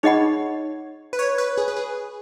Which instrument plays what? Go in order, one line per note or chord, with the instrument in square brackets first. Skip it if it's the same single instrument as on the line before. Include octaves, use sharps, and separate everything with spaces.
[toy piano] D#4 G#4 D#5 F#5 B5 [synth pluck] C#5
[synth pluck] B4
C#5
B4
G#4
B4
G#4